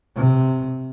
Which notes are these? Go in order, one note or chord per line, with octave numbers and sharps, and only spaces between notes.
C3